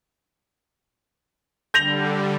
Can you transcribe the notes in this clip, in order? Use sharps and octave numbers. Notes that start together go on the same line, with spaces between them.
D3 G3 G6 A#6 F7